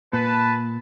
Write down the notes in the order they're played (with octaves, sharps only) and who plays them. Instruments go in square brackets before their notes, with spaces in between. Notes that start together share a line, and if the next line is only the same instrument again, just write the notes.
[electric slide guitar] A#2 [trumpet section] B4 A5